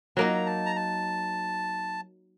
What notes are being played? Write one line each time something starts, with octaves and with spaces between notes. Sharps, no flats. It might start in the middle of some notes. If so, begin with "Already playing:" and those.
F#3 A#3 D#4 A#5
A5
A#5
A5